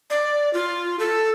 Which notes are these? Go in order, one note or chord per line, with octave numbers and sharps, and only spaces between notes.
D5
F4
A4